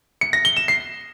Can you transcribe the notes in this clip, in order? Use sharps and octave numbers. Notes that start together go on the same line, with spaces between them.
C#7
A#6
G7
E7
C7